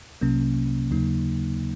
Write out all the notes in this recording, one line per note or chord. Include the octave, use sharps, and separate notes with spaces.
C2 C3 F#3 A#3 C#4
D#2 C#3 F#3 A#3 D#4